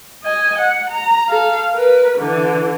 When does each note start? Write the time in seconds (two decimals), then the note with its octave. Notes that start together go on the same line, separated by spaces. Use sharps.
0.24 D#5 G#5
0.59 F#5
0.90 A#5
1.29 A4 F5
1.73 A#4 B4
2.18 D3 E3